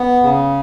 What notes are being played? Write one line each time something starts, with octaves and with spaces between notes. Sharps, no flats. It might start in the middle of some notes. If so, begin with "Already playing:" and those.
Already playing: B3
C#3